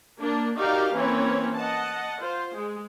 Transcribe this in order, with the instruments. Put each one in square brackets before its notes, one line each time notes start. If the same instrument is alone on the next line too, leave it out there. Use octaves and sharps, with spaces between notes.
[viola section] A#3 D4
D#4 F#4 G4 A#4 D5 F5
E3 A#3 C4 C#4 B4 C#5
D#5 F#5 A5
F4 C5
G#3